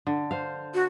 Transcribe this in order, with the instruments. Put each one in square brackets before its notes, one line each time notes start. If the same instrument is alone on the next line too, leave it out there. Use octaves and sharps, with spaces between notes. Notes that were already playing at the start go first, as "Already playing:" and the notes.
[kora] D3
C5 F5
[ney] F#4